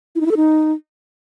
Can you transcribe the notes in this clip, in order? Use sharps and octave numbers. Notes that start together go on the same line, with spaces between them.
E4
D#4
E4
A4
D#4